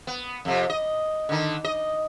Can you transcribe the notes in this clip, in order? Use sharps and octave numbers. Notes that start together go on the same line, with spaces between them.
B3
F2 C3
D#5
D3 D#3
D#5